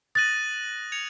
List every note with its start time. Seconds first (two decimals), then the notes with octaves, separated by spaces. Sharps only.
0.15 D#6 F#6 A6 A#6 D#7 F#7
0.92 G#6 C#7 F7